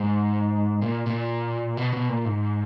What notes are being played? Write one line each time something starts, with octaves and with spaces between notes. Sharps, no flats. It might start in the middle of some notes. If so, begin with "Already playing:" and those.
Already playing: G#2
A#2
A#2
B2
B2
A#2
G#2